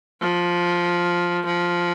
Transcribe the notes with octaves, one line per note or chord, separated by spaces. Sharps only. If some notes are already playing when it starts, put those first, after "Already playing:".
F3
F3